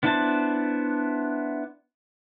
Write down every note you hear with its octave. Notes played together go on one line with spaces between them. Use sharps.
B3 D4 E4 C5 A5